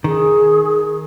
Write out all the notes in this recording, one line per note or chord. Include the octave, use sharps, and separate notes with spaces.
D#3 G#4